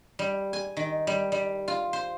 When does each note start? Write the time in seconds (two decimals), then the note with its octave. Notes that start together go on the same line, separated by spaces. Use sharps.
0.19 G3
0.53 G#5
0.77 D#3
1.07 G3
1.32 G3
1.68 F4
1.93 C5